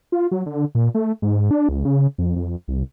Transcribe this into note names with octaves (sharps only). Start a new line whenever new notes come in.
F4
F#3
D3
A#2
A3
G#2
D4
C#2
C#3
F2
F2
C2